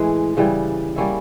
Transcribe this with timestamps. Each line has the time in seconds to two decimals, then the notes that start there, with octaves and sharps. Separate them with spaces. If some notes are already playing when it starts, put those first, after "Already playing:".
Already playing: A2 E3 G#3
0.37 C#3 E3 G3
0.96 G3 A#3 C#4 E4